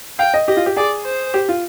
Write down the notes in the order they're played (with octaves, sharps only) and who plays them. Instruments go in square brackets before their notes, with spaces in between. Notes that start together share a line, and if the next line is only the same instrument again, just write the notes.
[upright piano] F5 [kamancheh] G5
[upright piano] D#5
[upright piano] G4 [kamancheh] D#5
[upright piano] F4
G4
[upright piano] G#4 [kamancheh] D5
[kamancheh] C5
[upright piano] G4
F4